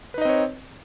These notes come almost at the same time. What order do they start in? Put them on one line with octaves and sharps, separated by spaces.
B4 D#4 D#5 C4 C#5